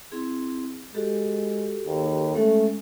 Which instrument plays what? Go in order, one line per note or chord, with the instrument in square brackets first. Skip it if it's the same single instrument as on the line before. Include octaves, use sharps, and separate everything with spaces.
[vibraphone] C4 E4 G#4
[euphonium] G#3 [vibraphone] F#4 G4 A4
[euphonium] D#2
[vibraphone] G#3 C#4 A4 [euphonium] A3